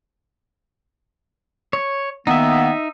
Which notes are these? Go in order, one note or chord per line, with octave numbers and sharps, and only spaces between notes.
C#5
D#3 A#3 B3 D#4 E5